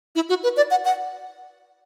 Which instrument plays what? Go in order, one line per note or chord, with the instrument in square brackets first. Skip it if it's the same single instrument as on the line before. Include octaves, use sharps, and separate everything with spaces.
[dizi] E4
F#4
B4
D5
F#5
F#5